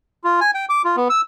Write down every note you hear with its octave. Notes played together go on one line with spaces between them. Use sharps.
F4
G#5
G5
D6
F4
B3
E6